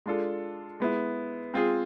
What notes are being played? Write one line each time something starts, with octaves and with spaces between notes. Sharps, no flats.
G#3 D4 F4 A4
G#3 B3 E4
G#3 C4 F4 G#4